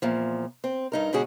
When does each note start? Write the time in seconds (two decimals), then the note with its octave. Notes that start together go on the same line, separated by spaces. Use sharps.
0.02 E2 A#2 F3
0.64 C4
0.92 G2 D#4 A#4
1.13 G#2 B2 D3 C#4 F#4 G#4